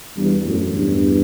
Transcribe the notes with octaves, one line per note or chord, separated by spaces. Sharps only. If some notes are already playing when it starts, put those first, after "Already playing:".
E2 G2
F#2 A2
E2 G2